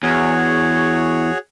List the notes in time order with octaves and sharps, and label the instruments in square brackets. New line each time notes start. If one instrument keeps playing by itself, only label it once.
[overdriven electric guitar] E2 [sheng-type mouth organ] F#4 G#4 C#5